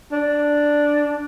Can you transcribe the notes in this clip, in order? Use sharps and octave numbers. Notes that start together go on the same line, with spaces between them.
D4